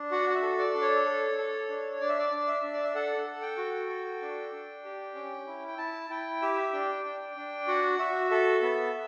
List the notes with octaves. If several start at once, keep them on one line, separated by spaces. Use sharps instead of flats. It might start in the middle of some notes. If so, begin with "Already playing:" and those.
Already playing: D4
F#4 F#5
F#5
E5
A4
D5
D4
C#5
A4
A4
D4
D4 D5
E5
D5
D4
E5
D4
D5
E5
A4 F#5
A4
G5
F#4
A4
D4
D4
G4
C#4
E4
G5
E4 A5
E4 G5
G4 E5
D4 G5
D4
D4
F#4 F#5
F#4 E5
A4 E5
B3